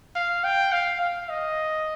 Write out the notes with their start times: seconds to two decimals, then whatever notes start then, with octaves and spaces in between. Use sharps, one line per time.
0.16 F5
0.44 G5
0.72 F5
1.01 F5
1.29 D#5